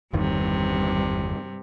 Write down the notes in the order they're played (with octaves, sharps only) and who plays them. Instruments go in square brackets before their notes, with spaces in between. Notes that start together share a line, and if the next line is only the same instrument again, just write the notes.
[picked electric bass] G1 E2 D#3 [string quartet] G2 C3